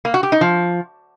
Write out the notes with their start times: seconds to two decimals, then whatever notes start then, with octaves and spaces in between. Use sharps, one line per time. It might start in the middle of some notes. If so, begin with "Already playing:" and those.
0.05 A#3
0.14 F#4
0.23 G4
0.32 D#4
0.41 F3